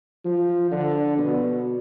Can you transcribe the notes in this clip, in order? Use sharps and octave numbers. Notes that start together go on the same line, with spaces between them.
F3
D3
B2